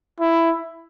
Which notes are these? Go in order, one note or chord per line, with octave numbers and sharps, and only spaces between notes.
E4